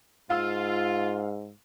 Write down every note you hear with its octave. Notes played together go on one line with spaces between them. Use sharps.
G#2 F4 F5 E6